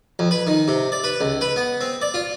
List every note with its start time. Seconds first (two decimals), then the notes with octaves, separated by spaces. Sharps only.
0.19 F2
0.31 B4
0.47 D#3
0.68 C3
0.92 D5
1.04 B4
1.21 C#2
1.41 B4
1.56 B3
1.81 C4
2.02 D5
2.14 F4